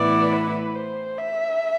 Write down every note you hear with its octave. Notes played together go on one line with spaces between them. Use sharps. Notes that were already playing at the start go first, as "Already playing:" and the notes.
Already playing: A2 E3 B3 E4 D5
B4
C5
E5